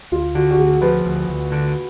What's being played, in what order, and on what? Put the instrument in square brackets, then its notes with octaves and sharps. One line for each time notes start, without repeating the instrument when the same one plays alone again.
[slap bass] D2 [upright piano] F4
[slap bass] D3 [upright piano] F#4
[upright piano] F#4
[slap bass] D2 [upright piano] G#4
[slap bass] F3 [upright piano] B4
[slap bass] D2
D2
D3